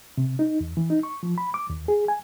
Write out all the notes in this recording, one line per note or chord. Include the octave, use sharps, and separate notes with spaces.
C3
D#4
E2
E3
D#4
C#6
F3
B5
D6
D#2
G#4
G#5